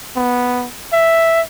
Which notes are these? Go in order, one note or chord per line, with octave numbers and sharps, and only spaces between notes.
B3
E5